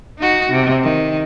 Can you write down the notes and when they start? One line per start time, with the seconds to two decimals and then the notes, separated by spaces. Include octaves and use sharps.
0.18 D#4 F#4
0.51 C3
0.83 D#3